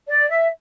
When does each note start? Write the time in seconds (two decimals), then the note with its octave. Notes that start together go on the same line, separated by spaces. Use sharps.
0.08 D5
0.30 E5